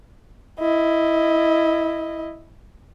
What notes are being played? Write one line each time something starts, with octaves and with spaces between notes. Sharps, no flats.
E4 D#5